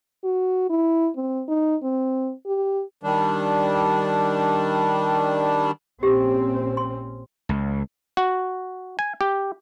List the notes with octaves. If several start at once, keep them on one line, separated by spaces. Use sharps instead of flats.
F#4
E4
C4
D#4
C4
G4
D#3 G3 D4
A#1 C4 C#4 G4
C6
C#2
F#4
G#5
G4